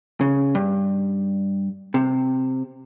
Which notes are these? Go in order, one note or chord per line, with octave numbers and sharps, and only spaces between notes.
C#3
G2
C3